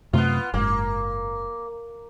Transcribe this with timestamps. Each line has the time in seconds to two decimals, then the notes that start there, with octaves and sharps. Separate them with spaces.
0.13 F#2 C3 A3 B3 F4
0.54 F#1 G#2 A#3